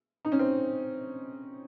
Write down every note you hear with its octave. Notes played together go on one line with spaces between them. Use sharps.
D#4
C#4
C4